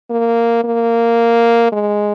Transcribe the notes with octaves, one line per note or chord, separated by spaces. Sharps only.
A#3
A#3
G#3